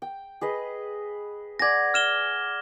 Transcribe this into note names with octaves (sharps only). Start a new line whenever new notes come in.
G5
G#4 B4 D#5
D5 F#5 G#5 G#6 A#6
F6 E7 G7